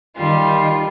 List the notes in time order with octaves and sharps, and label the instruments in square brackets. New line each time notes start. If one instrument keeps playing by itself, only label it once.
[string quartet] D#3 G3 F4